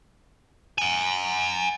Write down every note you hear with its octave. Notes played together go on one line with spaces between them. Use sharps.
F#5 G#5